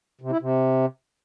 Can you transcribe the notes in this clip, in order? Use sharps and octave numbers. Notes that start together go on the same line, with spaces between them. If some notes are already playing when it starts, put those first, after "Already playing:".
C3
E4
C3